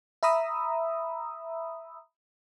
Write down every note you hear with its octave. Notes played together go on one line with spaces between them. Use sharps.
E5 A#5 B5 D#6 E6